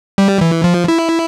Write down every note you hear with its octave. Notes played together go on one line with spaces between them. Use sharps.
G3
E3
F3
E4